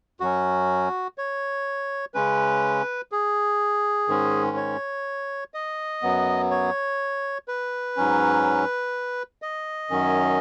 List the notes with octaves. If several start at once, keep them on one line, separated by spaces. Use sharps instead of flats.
F#2 F#3 C#4 F#4
C#5
C#3 G#3 C#4 B4
G#4
G#2 D#3 G#3 C#4
C#5
D#5
F#2 F#3 B3
C#5
B4
G#2 F#3 C#4
D#5
F#2 D#3 F#3 C#4